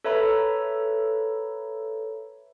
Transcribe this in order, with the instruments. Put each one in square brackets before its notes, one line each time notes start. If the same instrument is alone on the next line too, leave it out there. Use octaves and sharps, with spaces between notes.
[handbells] A4 B4 C#5 E5 A#5 B5